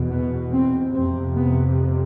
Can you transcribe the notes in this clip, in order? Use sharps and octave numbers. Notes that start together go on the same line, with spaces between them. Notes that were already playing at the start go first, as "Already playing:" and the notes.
Already playing: E2 B2
B3
C4
F2 C3 C4
B3